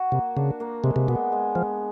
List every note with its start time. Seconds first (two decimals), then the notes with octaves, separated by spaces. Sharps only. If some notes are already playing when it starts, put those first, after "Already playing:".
Already playing: F#4
0.12 C3 A#3
0.37 C#3 D4
0.60 A#3
0.84 C3 G#3
0.96 C3
1.08 B2 B3
1.32 G#3
1.55 F3 G#3